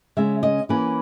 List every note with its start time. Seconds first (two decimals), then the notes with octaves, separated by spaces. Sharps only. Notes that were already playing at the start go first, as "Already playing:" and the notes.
0.17 C#3 G#3 C#4 E5
0.43 D#5
0.69 E3 A#3 C#4 B4